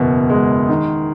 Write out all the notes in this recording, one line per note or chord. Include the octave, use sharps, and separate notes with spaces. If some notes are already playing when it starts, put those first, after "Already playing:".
Already playing: F#1 E2 B2
G#3
D#3